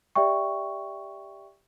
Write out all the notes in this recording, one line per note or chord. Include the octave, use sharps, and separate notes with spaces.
G4 D5 E5 G5 C#6